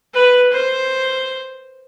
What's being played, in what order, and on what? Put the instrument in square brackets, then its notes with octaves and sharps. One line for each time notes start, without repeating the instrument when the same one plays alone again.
[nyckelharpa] B4
C5